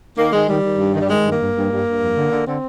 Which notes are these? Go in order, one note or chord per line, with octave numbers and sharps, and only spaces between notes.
D#3 A#3
D#3 G#3
D#3 G3
D#3
G2
D#3
G3
D#3 G#3
G2
A#3
G2
G2
G2
G2
F2
D3
D3
D3 C4